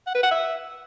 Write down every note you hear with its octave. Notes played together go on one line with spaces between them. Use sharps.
F#5
B4
F#5
E5